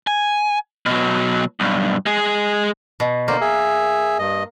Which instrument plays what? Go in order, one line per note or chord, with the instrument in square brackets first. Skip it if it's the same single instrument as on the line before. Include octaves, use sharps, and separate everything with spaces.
[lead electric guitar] G#5
B2 F#3
B1 G2
G#3 G#4
[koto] B2
[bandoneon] D3 C5 D5 [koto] A#3
[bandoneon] G#4 E5
G2 D#5